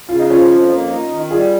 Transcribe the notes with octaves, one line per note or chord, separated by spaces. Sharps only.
C#3 F4
D#4
F3 C#4 F4
F2
A#3
D#4
D#3
G3 F4 G#4